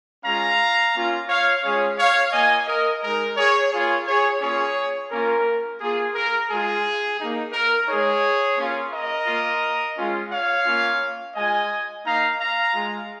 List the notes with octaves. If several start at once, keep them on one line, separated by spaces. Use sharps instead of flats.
G#3 C#4 F4 F5 A#5
A#3 C#4 F4
C#5 F5
G#3 C#4 F4 G#4 C#5
C#5 F5
A#3 F4 D#5 G#5
A#4 D#5
G#3 D#4 A#4
G#4 C#5
A#3 F4 G#4 C#5
G#4 C#5
A#3 C#4 F4 G#4 C#5
A#3 C#4 F4 A#4
A#3 F4 G#4
A#4
G#3 F4 G#4
A#3 D#4
A#4
G#3 D#4 G#4 C#5
A#3 C#4 F4
A#4 D#5
A#3 F4
G#3 C#4 F4
C#5 F5
A#3 C#4 F4
G#3 F4 D#5 G#5
A#3 D#4 F5 A#5
F5 A#5
G#3 F4